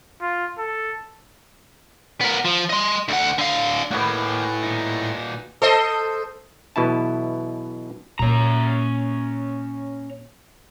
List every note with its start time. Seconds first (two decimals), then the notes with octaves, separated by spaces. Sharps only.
0.22 F4
0.58 A4
2.21 B3 A#4
2.45 F3
2.69 D#5 C6
3.08 D2 F#5
3.38 D3 F5
3.91 A2 A#3 D#4 F#4 G#4 B4
4.63 A#2 D#4
5.62 A4 C5 D#5
6.76 B1 B2 E3 E4 A5
8.19 A#2 A#3 C#4 A#5